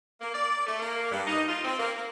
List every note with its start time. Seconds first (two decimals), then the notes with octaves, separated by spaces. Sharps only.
0.21 A#3
0.35 D5
0.67 A3
0.80 A#3
1.12 G2
1.27 D#4
1.48 F4
1.65 C4
1.79 A#3
1.96 A#3